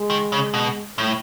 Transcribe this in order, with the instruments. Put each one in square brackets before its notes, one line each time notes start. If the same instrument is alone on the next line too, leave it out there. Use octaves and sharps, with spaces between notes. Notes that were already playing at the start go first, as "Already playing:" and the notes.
Already playing: [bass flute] G#3
[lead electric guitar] D#3
C#3
B2
A2